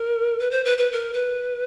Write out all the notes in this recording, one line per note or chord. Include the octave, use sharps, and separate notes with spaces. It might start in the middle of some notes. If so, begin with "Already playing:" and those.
Already playing: A#4
B4
C5
B4
B4
A#4
B4